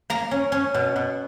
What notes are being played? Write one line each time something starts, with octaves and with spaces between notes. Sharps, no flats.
A#3 A#5
C#4
C#4
B2
B2